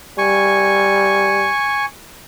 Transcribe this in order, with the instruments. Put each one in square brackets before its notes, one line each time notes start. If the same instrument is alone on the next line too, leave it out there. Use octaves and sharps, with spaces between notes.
[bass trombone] G3 [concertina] G#5 C#6